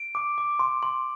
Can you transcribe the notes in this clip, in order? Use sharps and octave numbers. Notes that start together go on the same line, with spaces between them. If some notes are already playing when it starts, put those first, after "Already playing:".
Already playing: D7
D6
D6
C6
C6